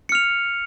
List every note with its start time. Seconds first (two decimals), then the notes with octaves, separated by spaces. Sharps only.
0.09 C#7
0.12 F6
0.15 F7